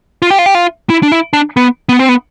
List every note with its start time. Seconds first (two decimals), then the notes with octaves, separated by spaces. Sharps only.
0.22 F4
0.31 G4
0.39 F4
0.46 G4
0.55 F4
0.90 E4
1.03 D4
1.12 E4
1.33 D4
1.57 B3
1.89 B3
1.99 C4
2.09 B3